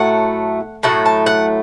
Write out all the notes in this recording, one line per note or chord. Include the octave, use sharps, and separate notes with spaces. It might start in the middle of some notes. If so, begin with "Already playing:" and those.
Already playing: A2 F#3 A3 F#5
A2 F#3 A3 F#5
A5
F#5